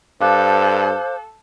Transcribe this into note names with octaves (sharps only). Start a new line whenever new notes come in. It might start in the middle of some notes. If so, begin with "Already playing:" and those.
G2 A4 C5 F5 D6 F#6